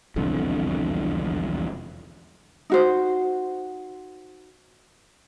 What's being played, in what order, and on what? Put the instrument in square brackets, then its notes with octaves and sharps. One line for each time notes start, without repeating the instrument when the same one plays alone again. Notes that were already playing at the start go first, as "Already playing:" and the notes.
[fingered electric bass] E1 C2 F2 D3
[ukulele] D#4 F#4 C5